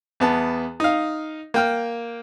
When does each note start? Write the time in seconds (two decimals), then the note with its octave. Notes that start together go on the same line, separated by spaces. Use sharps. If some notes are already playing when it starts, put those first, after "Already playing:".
0.20 E2 B3 A5
0.80 D#4 F5
1.54 A#3 G5 F6